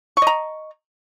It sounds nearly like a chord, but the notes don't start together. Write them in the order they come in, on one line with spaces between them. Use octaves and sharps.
C#6 D#5 A#5